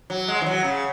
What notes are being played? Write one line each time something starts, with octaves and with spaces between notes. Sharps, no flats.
F#3
G#3
E3
F#3
C#3